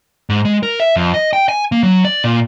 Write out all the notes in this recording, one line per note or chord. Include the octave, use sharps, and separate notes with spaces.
G#2
G#3
A#4
E5
F2
D#5
G5
G#5
A#3
F#3
D5
A#2